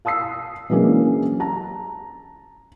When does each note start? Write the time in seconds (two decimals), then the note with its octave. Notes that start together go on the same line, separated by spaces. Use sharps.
0.05 F5 A5 D#6 E6 C7
0.70 E3 F#3 G#3 A#3 C#4 D4
1.40 A5 A#5